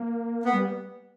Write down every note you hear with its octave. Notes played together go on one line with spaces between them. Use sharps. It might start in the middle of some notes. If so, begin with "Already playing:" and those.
Already playing: A#3
B3
G3